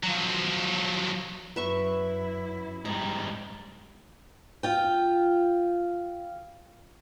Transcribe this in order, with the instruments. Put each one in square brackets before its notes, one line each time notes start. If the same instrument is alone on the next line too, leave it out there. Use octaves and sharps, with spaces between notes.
[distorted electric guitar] F3 F#3
[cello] F#2 E4 [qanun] B4 E5 C#6
[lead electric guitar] G#2 G3 [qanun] A#5
[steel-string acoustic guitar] F4 G5